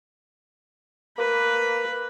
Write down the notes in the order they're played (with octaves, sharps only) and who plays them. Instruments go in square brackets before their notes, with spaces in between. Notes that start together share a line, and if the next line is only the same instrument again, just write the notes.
[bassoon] A#3 [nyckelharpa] B4